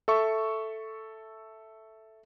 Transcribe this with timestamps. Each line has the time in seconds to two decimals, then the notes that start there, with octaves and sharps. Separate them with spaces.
0.08 A4 E5 C#6